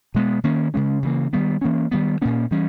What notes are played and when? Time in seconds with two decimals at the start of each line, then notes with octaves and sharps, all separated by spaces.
0.14 B2 G#3 B3
0.44 D#3 A#3 C#4
0.74 C#3 G#3 C#4
1.03 C#3 E3 A#3
1.33 D#3 G3 B3
1.61 E3 A#3 C#4
1.91 D#3 G3 B3
2.22 A#2 A#3 C#4
2.51 E3 G3 C#4